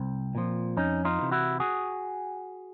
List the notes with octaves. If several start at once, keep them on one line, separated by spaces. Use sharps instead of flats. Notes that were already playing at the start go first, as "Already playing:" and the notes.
Already playing: C2 C4
A#2 F3
F2 C#4 D#4
D#4 F4
C3 E3
E4 F#4
F#4 G#4